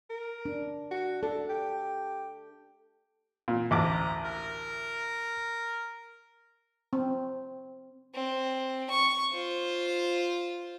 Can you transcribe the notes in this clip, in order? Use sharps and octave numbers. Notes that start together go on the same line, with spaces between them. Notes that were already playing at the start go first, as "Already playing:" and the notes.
A#4
D4
F#4
D4 A4
G4
A#2
A1 D2 A#5 D6
A#4
C4
C4
C#6
F4 C5